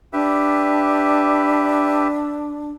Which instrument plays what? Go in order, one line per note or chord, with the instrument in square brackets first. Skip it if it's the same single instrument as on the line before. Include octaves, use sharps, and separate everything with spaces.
[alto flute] D4 [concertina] G4 B4 E5